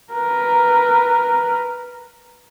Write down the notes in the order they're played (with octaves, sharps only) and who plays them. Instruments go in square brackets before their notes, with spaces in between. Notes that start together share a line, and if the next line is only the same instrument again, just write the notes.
[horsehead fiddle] A#4 B4